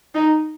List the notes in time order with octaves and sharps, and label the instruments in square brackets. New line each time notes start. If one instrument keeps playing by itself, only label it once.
[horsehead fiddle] D#4